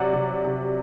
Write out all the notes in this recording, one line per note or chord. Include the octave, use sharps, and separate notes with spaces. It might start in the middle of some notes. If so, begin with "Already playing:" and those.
Already playing: C3 F#3 D5 F#5
C3
C3